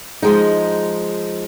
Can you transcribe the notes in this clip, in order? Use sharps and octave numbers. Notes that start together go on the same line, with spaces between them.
F3 G#3 D#4